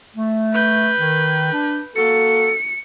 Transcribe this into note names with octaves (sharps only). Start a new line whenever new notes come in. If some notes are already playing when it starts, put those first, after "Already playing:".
A3
B4 G6
D#3
D4
A#3 F#4 A4 C#7